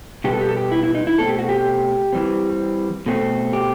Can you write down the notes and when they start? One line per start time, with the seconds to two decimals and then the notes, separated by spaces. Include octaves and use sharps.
0.24 B2 G3 B3 G4
0.33 A4
0.41 G4
0.49 A4
0.57 G4
0.72 E4
0.83 E4
0.95 D#4
1.07 E4
1.18 B2 A3 C4 A4
1.29 G4
1.39 F#4
1.49 G4
2.13 E3 G3 C4
3.06 B2 A3 C4
3.53 G4